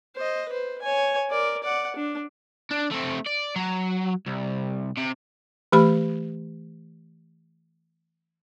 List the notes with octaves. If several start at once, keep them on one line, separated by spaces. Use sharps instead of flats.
C5 D#5
B4 C5
C#5 G#5
A#4 D5
D5 F#5
D4
D4
A3 C4
D5
F#3
C2
C3
E3 A3 G4 B5